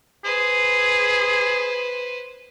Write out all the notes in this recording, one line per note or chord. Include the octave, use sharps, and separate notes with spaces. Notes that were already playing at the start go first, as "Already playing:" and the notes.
G#4 B4 C5